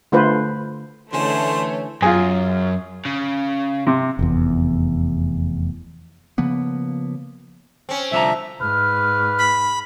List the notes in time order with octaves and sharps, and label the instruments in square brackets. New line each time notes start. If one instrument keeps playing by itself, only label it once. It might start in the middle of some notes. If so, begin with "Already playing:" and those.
[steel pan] D3 A3 F4 B4 C5
[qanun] D3 G#3 C#4 [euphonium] E3 [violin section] A3 C#5 [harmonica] C5
[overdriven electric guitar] F#2 [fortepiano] F4 G#4
[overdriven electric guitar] C#3
[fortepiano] C3
[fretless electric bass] F1 E2
[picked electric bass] C#3 F3 A#3 B3
[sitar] C4 C#4
[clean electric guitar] C2 D3 A#5 [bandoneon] F3 E5
[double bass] G#2 [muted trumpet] B4 [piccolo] F6
[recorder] B5